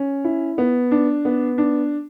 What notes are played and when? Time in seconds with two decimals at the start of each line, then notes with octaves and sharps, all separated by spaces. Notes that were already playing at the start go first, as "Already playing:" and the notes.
Already playing: C#4
0.24 E4
0.58 B3
0.91 D4
1.25 B3
1.58 D4